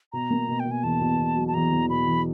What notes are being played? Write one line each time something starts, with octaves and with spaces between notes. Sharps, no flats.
B2 A#5
A#3
B2
G5
B2
G#5
E2 A5
B2
B2
F#3
A5
E2 A#5
E2
B2 B5
E2